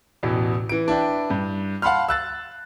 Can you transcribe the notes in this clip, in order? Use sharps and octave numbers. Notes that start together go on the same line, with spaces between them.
A1 E2 B2
E3 D7
D4 E4 B4 G5
G2
F5 F#5 A5 B5 C6 F6
E6 F#6 A6